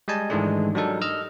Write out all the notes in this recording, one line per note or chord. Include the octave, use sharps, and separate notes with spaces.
G3 G#3 D#5 G#5 A5
G#2 D#3 E3 G#3 A3 D4
F#3 G3 D4 D#4 A4 A#4
D#5 E6 F6